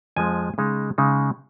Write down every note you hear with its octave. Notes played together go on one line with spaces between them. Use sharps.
F2 F3 G#3 G#5
C#3 G#3 D#4
C#3 G#3 D#4